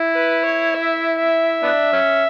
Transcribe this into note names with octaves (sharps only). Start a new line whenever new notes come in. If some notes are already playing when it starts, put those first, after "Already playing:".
Already playing: E4
B4
C#5
E5
E5
B3 D4
F#3 C#4